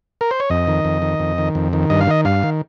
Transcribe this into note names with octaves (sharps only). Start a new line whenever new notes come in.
A#4
C5
C#5
F2 D#5
D#3
F2
D#3
F2
D#3
F2
D#3
G2 D#5
F5
D#3 D#5
G2 F5
D#3